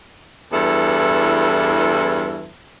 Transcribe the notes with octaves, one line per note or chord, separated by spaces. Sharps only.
E2 G2 E3 E4 A4